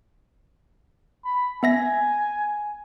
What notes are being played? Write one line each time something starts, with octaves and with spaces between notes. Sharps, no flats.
B5
B3 E5 G#5 A#6